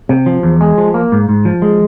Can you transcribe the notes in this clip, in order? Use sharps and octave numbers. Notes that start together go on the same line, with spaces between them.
C3
F3
E2
G#3
F3
A#3
G#2
G#2
F3
G#3